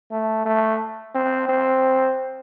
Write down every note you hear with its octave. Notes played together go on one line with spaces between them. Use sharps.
A3
A3
C4
C4